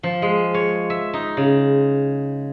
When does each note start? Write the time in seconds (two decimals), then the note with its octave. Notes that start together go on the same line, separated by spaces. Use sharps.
0.03 F3
0.22 G#3
0.54 C#5
0.90 E5
1.13 D#4
1.37 C#3